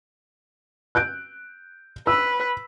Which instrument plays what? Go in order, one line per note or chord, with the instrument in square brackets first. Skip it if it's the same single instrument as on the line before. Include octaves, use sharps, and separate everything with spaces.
[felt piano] F#6 G6 D7
[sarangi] B4 [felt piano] E6